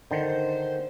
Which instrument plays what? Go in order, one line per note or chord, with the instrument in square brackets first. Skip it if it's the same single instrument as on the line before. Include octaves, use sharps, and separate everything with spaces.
[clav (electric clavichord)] D3 D#3 [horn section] C5